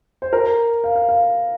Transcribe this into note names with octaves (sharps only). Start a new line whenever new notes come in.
C5
A#4
F5
F5
F5